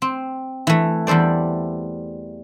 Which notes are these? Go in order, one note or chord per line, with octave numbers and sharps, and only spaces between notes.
C4
E3 A3
E2 G3 A4 C5 D5